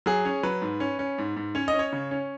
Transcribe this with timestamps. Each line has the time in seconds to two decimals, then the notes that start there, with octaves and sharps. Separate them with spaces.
0.06 F#3 G#4
0.25 C#4
0.43 F#3 B4
0.62 G#2
0.80 C#4
0.99 C#4
1.18 G#2
1.36 G#2
1.55 C#4 C#5
1.68 D#5
1.73 C#4
1.79 C#5
1.93 C#3
2.11 C#4